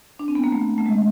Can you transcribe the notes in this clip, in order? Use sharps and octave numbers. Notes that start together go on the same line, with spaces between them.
D4
C4
B3
A#3
A3
A3
G#3